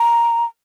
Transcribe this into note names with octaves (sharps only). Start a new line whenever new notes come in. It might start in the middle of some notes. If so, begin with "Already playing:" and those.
Already playing: A#5